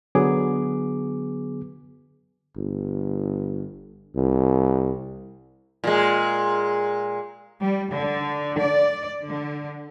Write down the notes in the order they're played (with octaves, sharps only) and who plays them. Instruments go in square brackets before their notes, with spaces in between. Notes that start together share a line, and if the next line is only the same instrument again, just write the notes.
[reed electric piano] D3 F#3 B3 G#4 D6
[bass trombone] G1
C2
[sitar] A#2 G#3
[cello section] G3
D3
D5
D3